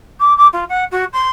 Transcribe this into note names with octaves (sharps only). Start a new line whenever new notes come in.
D6
D6
F4
F#5
F#4
C6